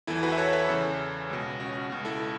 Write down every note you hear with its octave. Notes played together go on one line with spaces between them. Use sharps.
E2 E3 E4 A4
F#4 B4
E5
A4 C#5
B4 E5
E2 C#3 E3 A4 C#5
C#2 B2
C#4 F#4
C#2 B2
E4 A4